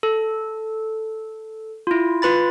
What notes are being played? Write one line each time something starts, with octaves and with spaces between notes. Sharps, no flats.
A4
E4 F4
F4 B4 B5 A6